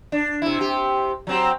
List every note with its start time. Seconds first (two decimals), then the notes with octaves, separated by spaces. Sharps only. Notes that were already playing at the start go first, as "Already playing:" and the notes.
0.12 D4
0.42 C3 E4
0.59 C3 G4
1.27 F#3 C4 G4